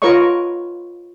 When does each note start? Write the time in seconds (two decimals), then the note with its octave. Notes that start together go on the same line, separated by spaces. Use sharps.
0.02 F4 A#4 B4 C#5 D#5 C#6